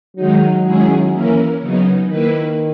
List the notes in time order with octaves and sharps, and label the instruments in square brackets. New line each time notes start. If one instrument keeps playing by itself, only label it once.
[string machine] D#3 G#3 D#4 [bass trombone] F#3
[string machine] D#3 G#3 C#4 E4 G#4
E3 A#3 C#4 E4 A#4
C#3 F#3 B3 D#4
[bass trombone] D#3 [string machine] A#3 E4 B4